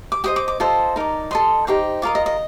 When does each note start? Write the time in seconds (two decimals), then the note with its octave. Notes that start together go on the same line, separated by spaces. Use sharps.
0.12 D6
0.24 G4 C5 D#5 D#6
0.36 D6
0.48 D6
0.60 F4 A4 C5 D#5
0.96 D#4 A#4 D5
1.31 A4 C5 D#5 C6
1.67 D#4 G4 C5 D6
2.02 F4 A#4 D#5 D6
2.15 D#5
2.26 D#5